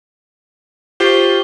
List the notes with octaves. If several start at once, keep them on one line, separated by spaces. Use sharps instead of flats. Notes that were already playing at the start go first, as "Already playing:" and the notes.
F4 G4 C5 C#6 C7 G7